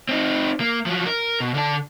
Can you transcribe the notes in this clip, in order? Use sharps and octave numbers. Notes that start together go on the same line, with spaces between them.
C4 D#4
A#3
F3 F#3
A#4
B2
D3 A5